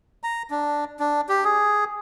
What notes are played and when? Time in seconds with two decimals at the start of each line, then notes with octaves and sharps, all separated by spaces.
0.23 A#5
0.50 D4
0.99 D4
1.29 G4
1.45 G#4